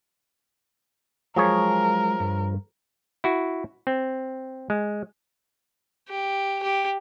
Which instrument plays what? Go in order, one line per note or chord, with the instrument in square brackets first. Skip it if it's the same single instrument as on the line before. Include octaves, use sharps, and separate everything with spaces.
[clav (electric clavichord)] F3 G#4 C#5 [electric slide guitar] F#3 G#3 [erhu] A#4
[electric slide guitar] G2
[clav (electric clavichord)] E4 F#4
C4
G#3
[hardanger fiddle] G4
G4